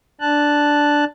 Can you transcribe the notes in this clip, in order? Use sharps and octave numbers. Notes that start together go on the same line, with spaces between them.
D4 A5 F#6